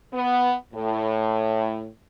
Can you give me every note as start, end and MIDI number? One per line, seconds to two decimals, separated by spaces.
0.14 0.54 59
0.74 1.88 45